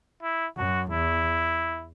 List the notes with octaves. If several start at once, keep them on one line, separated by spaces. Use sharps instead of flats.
E4
F#2 F#4
E2 E4